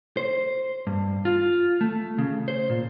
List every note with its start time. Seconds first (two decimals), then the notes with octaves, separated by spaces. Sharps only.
0.17 C5
0.87 G2
1.25 F4
1.81 A3
2.18 C#3
2.48 C5
2.70 A#2